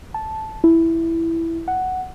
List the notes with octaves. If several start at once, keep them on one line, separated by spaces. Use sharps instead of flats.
A5
E4
F#5